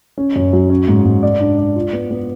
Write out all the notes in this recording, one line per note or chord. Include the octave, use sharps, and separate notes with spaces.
C#4
F#2
F#3
C#4
G#2
G#2
D5
D4
D5
F4
B3
B3